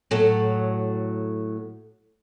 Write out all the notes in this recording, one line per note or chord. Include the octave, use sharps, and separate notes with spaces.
A2 F#3 A4